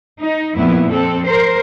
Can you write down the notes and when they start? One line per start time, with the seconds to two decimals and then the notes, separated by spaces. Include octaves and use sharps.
0.20 D#4
0.54 F2 A#2 F3 B3 E4
0.88 F2 C4 A4
1.24 A#4 C5